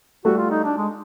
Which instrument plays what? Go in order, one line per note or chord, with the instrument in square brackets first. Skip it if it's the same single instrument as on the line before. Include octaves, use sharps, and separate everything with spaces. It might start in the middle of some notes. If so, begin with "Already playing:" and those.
[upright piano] G3 A3 [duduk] F#4
[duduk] F4
D#4
D4
G#3